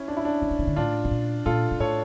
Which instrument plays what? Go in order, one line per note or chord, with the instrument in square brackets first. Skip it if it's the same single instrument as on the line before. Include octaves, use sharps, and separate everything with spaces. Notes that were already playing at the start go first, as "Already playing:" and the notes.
Already playing: [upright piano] C#4 E4
D4
E4
D4
[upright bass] E3
D3
C#3
D3
[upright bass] A2 [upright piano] D4 F4
[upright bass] C#3
A#2
[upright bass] A#2 [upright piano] F4 A4
[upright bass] A#2
[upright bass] A2 [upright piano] A4 C#5